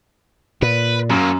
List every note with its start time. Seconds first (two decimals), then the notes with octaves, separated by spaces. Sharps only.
0.62 A#2 B4
1.10 F#2 F#3 A#3